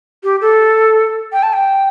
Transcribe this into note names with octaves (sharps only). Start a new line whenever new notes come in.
G4
A4
G5
A5
G5